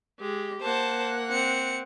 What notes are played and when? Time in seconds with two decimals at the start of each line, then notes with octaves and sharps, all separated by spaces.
0.19 G#3 G4
0.62 A#3 C5 F#5 A5
1.30 C4 C#7